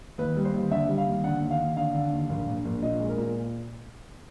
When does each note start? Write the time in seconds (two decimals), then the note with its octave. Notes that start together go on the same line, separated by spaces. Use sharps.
0.18 D#2 B4
0.37 G3
0.45 C5
0.54 D#2
0.71 D3 E5
0.89 G3
0.98 F5
1.07 D#2
1.24 D3 F#5
1.41 D#2
1.51 F5
1.59 D#2
1.77 D3 F5
1.94 D3
2.12 D#2
2.29 A#1
2.47 A#1
2.65 A#1
2.82 A#2 D#5
3.00 G#3
3.09 A#4
3.18 A#2